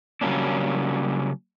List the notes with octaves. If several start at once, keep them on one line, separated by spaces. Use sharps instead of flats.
C#3 F#3 G3 A#3 C#4 D4